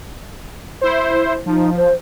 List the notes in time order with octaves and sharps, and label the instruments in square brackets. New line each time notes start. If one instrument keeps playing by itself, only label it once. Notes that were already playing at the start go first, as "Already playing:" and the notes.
[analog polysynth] E4 C5
[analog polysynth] F3 [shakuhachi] D#4
[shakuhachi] C5